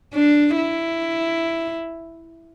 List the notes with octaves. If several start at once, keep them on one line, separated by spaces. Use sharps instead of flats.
D4
E4